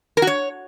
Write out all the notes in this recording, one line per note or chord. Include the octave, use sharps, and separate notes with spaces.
A#4
F#4
C#5